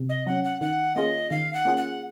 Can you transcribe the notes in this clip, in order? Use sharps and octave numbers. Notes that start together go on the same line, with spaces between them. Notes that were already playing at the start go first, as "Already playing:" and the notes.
Already playing: C3
D#5
F#3 C#4 F#5
F#5
D#3 F#5
A#3 C#4 F4 G#4 D#5
D#3 F5
F#5
A#3 C#4 F4 G#4
F#5